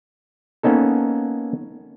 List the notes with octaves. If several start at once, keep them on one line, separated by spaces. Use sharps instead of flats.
A#3 B3 C#4 D#4 A4